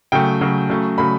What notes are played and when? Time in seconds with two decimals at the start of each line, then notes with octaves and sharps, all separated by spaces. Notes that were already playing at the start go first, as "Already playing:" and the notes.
0.12 C#3 F#3 A3 G5
0.41 C#3 F#3 A3
0.70 C#3 F#3 A3
0.98 C#3 F#3 A3 B5